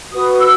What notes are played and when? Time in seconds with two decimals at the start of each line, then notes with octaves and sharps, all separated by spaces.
0.12 F#4 B4 D#6
0.33 D#6
0.40 E6